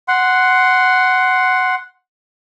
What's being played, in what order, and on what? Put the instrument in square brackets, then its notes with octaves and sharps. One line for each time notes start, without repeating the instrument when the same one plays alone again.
[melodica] F#5 C6